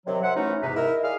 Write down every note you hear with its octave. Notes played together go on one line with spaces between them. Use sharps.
C3 D#3 F#3
C5 E5 F#5
E3 F#3 A3 C#4 D#4
E2 G#2 C3 D#4 B4
D#4 E4 A#4
G#4 D5 F5